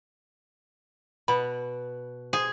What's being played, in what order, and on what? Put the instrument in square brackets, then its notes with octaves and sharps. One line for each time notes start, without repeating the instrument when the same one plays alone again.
[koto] B2 [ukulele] B5
[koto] G#4 [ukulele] C5